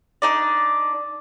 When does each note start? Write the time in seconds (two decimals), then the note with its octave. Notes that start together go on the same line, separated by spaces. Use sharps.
0.22 D4 D#4 D5